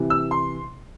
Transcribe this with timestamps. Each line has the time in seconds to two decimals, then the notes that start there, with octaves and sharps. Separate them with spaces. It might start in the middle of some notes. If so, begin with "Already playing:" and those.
Already playing: C3 E3
0.10 E6
0.31 C6